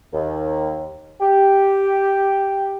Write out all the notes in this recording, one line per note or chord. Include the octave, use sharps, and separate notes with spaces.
D#2
G4